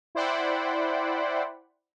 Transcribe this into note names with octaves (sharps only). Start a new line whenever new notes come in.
E4 C5 D5 F#5 G5 B5